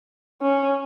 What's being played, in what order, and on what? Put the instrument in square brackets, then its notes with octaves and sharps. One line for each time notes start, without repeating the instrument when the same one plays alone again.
[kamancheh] C#4